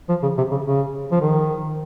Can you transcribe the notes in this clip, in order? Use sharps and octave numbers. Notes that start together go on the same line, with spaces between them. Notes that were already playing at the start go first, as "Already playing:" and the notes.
F3
C#3
C3
C#3
C#3
F3
D#3